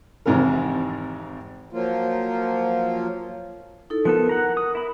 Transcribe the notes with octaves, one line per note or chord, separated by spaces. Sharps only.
G#1 F2 G#2 C3 E3 A#4
F3 F#3 A#3 F4
D#4 E4 A4
F3 B3 A4 A#4
F#5 A#5
D#6
E4 B5